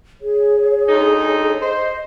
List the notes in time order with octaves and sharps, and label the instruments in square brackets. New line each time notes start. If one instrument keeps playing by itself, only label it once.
[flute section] G#4 C#5
[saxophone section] D2 D#4
[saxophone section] C5 [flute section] D#5